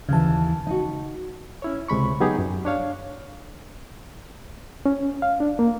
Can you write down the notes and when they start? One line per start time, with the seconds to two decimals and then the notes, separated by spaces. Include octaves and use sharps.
0.09 D#2 C#3 E3 A5
0.67 D#4 F#4
1.62 C#4 E4 C#5
1.88 C#2 C3 G#3 B5 C#6
2.20 F#3 B3 D#4 G4 G#4
2.38 F#2
2.65 D4 C#5 F5
4.86 C#4
5.22 F5
5.40 D4
5.59 A#3